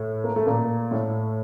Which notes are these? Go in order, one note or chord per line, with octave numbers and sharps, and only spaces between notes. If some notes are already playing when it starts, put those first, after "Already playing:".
Already playing: A2 A3
A#3
A3
A#2 A#3
A2 A3